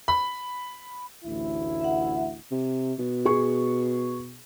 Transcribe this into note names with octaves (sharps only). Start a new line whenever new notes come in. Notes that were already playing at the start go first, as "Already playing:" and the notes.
B5
A1 D2 E4
E5 F#5
C3
B2
G#4 C#6